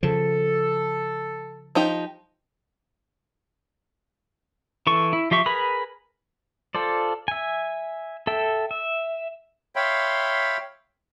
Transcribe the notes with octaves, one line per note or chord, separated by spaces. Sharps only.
C#3 F3 A4
F3 D#4 G4
E3 A4 C#6
E4
F3 G4 E5 C#6
G#4 A#4 B4 B5
F4 A4 C5 D5
E5 G#5
A4 E5 G5
E5
C#5 E5 F5 G5 B5 C6